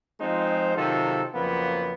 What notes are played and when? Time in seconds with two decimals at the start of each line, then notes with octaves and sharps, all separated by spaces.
0.19 F3 G#3 C4 D#4 F4 C5
0.76 C3 D#3 F#3 D#4 F4 A4
1.34 F2 C#3 F3 F#3 A#3 B3